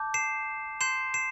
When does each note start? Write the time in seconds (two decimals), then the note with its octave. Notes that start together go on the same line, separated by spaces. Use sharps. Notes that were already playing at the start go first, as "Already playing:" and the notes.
Already playing: A5 D6 G6
0.14 C7 E7
0.81 C6 G6 C7 E7
1.14 C7 E7